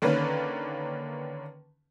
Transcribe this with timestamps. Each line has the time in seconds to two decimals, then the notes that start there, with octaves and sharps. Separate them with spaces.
0.02 D3 D#3 A#3 C#4 B4